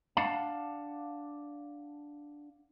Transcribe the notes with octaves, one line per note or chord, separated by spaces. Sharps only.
D4 F5 F#5 A5